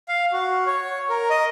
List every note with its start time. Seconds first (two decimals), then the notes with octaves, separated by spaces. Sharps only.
0.08 F5
0.32 F#4
0.66 C#5
1.10 A#4
1.30 D#5